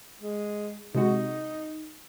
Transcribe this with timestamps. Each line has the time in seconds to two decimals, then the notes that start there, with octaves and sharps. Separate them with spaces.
0.22 G#3
0.95 C3 G#3 D#4 F#4